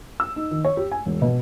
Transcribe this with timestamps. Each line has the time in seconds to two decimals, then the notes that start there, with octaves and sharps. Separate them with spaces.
0.20 E6
0.36 D#4
0.51 D#3
0.65 C#5
0.77 G4
0.92 G#5
1.06 E1
1.22 B2